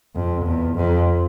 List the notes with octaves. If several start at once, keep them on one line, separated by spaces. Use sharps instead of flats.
F2
E2
F2